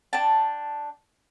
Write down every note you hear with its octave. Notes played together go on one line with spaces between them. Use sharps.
D4 G5 A5